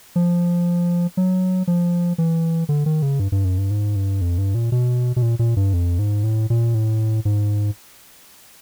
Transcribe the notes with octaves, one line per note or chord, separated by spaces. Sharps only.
F3
F#3
F3
E3
D3
D#3
C#3
G2
G2
F#2
G2
G#2
G2
F2
G2
A#2
B2
B2
A#2
A#2
G2
F2
G#2
A2
A#2
A2
G#2